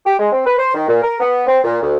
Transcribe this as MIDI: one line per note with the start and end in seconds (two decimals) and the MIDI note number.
0.05 0.13 67
0.19 0.31 56
0.32 0.42 60
0.46 0.54 71
0.58 0.71 72
0.74 0.87 51
0.88 1.01 46
1.01 1.15 70
1.21 1.45 59
1.46 1.59 60
1.64 1.79 46
1.81 1.97 38